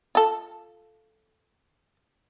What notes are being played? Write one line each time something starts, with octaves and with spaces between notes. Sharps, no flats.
F4 A4